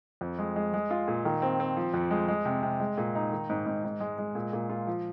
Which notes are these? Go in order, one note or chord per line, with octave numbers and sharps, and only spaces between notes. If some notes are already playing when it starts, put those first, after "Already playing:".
F2
G#3
G#3
G#3
F4
A#2
D#3
C4
C4
F3
F2
G#3
G#3
C3
C3
G#3
A#2
D#4
D#3
G#2
G#2
G#2
G#3
G#3
A#2
A#2
F4
F3